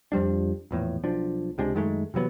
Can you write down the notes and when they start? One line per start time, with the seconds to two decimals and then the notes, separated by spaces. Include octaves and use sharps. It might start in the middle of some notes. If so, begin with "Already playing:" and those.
0.12 F2 F3 G3 D4
0.71 A#1 E2 A2
1.04 B1 F3 D4
1.58 C#2 C3 G#3 D4
1.75 F#2 D#3 G#3 A3
2.14 C3 E3 F#3 B3